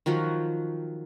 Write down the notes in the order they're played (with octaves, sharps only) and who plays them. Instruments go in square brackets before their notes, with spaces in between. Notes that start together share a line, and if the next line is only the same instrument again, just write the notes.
[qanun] D#3 F3 F#3 F#4